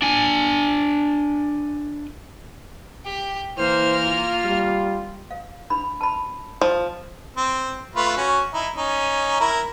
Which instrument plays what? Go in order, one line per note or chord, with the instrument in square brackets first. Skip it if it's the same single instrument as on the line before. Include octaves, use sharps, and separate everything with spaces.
[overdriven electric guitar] D4 G#5
[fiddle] G4
[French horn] E3 [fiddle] A#3 F6 [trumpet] C5
[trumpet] F4
[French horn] G3
[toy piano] F5
D4 B5
A5 B5
[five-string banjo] F3
[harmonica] C4
A3 F4 B4
C#4 F#4
D#4 E4
C#4 D#4
E4 A#4